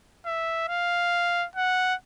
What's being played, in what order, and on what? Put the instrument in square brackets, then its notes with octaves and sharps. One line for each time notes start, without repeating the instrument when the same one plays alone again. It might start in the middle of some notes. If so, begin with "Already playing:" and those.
[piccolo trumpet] E5
F5
F#5